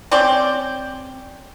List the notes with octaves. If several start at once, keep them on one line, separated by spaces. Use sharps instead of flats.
C4 C#4 C5 D5